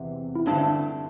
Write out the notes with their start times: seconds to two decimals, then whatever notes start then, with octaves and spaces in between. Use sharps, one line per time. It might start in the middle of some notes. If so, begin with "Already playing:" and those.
Already playing: E2 C3 E3 C4
0.35 E4
0.46 G2 D3 A3 C4 D4 A4